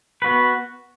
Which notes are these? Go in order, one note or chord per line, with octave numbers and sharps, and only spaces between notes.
B3 F#4 B4